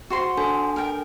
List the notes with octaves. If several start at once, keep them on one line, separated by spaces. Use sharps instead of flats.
F#4 C5 C6
D4 A4 G#5
A#4 G5